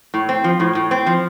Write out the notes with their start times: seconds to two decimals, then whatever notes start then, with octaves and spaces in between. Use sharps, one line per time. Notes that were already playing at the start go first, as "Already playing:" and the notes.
0.14 A2
0.29 C4
0.44 F3
0.60 A2
0.75 A2
0.91 C4
1.06 F3